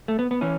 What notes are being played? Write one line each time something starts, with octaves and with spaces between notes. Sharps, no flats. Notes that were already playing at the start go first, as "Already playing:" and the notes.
A3
B3
B3
E3 C#4